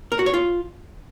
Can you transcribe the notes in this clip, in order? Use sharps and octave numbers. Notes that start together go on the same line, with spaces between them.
A#4
F#4
C#5
F4